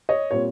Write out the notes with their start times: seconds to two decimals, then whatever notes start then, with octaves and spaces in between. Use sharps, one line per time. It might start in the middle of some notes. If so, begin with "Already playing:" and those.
0.09 C#5 D#5
0.31 A#2 G3 C4 C#5